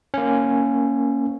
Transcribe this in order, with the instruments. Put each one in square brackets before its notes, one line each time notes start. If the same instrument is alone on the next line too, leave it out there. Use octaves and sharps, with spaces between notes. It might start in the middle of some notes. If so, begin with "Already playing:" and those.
[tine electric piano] A#3 C#4